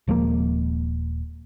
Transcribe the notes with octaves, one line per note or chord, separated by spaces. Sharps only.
D#1 F3 G#3 A#3